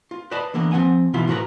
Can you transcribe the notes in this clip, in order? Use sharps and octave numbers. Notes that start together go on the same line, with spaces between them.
F4
B4 D5 D#5 A5 B5
D3 E3 A#3 B3
F3 C4 F#5 G#5
B2 D#3 E3 F4 B5
A2 F#4 A#4 B4 A#5